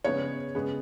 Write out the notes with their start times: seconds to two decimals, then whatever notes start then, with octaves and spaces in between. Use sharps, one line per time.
0.04 C#3 G#3 B3 C#5
0.55 C#3 G#3 B3